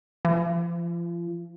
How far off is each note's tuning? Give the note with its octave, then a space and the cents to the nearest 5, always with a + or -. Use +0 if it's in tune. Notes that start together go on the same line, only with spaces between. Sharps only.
F3 -35